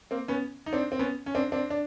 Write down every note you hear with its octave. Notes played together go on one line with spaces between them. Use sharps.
A#3 C4
B3 C#4
D#4
C4 D4
C4
B3 C#4
C#4
C4 D4
C4 D4
D4